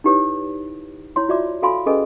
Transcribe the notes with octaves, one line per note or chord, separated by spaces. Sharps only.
D#4 E4 G4 B4 C#5 D6
E4 C#5 C6
F4 F#4 D5 E5 D6
F#4 A4 F5 G#5 B5 C6
C#4 G#4 A4 B4 D#5 G#5